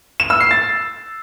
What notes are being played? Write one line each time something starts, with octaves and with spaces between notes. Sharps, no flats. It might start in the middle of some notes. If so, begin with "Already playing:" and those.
E7
E6
C7
A6